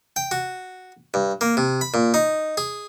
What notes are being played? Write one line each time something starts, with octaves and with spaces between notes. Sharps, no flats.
G5
F#4
G2
A#3
C3
B5
A#2
D#4
G#4